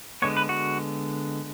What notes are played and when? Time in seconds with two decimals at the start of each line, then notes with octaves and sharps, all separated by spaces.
0.22 D3 G#3 B3 C#5
0.37 B4
0.49 F#4